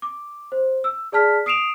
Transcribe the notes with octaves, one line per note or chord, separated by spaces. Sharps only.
D6
C5
E6
G#4 D5 A5 F6 B6
D#6 C7 D7 E7 F7